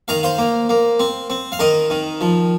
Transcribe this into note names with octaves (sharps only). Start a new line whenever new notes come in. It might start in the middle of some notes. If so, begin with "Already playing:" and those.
D#3 F5 A#5
C5 F5
A#3
A#3
C4
C4
F5
D#3 A#4 D#5
D#3
F3